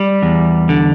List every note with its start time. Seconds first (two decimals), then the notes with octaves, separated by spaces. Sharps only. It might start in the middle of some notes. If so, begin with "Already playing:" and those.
Already playing: G3
0.22 E2
0.69 D3